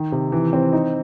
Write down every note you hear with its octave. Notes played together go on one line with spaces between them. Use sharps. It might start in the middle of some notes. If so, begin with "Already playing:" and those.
Already playing: D#3
C3
E3
C4
D#4